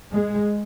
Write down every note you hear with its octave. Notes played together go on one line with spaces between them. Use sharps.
G#3